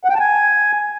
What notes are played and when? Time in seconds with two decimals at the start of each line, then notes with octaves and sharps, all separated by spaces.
0.04 F#5
0.09 G5
0.15 A5
0.20 G#5